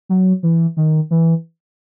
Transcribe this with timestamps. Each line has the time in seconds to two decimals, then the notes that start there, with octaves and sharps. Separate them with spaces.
0.09 F#3
0.43 E3
0.77 D#3
1.11 E3